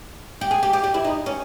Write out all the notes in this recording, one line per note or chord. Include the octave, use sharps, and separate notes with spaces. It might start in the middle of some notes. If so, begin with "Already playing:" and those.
G4
G#4
G4
G4
G4
E4
D#4
C#4